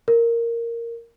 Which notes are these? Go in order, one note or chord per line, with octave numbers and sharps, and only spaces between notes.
A#4